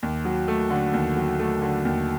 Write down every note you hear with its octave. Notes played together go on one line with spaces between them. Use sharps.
D#2
F#3
A3
D3
D#2
F#3
A3
D3
D#2